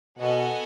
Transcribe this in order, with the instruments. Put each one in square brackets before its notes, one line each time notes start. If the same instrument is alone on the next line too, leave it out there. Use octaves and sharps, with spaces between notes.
[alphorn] B2 [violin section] B3 F#4 A4 D#5 G#5